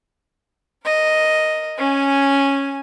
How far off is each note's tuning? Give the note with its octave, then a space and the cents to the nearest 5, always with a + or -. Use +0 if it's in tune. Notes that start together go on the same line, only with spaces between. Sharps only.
A#4 -10 D#5 +0
C#4 -5 G#5 +0